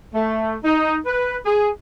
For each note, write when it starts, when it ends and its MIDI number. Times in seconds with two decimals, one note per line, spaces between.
0.14 0.56 57
0.64 0.98 63
1.06 1.38 71
1.46 1.69 68